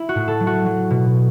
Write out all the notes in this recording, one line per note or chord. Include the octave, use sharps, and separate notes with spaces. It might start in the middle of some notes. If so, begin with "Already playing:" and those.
Already playing: E4
F#4
A2
A4
F#3
F#4
F#3
B2